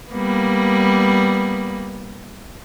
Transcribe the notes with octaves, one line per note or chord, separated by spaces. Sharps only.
G3 A#3 B3